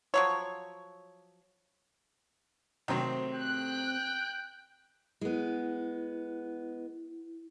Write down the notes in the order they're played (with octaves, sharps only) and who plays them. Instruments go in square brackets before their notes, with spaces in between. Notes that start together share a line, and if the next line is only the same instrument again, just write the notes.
[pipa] F3 F#3 C#5
[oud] C3 A3 [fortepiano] D#3 F#3 C4
[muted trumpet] G5 [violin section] F#6
[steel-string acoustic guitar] G#3 B3 [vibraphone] E4